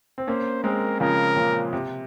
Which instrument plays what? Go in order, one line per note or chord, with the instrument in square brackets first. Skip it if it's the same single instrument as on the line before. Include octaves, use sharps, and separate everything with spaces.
[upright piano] C4
[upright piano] A#3 C#4 [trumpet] C5
[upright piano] G#3 C4 [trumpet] A#4
[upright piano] C#3 F3 [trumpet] A#4
[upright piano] A#2 C#3
C3